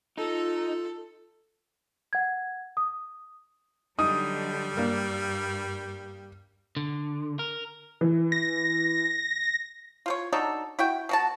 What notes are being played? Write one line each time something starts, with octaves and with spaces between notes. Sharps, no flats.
D#4 F4 A4
F#5 G#6
D#6
D3 F#3 G3 D#4 D#6
G2 A#3 D4
D3
A#4
E3
A#6
F4 C5 C#5
F#3 D4 D#4 A4
E4 F#4 G5
B2 F#4 A5